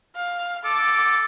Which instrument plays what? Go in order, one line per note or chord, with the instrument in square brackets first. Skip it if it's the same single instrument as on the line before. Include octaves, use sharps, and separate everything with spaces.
[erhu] F5
[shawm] A4 [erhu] D6